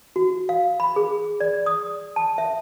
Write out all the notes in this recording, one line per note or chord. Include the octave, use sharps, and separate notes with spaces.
F#4
F5
B5
G#4
D5
D#6
A5
E5